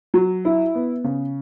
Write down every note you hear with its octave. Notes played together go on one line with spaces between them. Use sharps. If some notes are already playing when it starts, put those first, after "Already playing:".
F#3
E4
B3
C#3